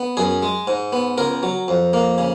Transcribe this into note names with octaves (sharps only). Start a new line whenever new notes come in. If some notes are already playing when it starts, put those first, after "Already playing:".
Already playing: B3
F#2 G#4
G#3
G#2
B3
C#2 A#4
F#3
F2
A#3
C#3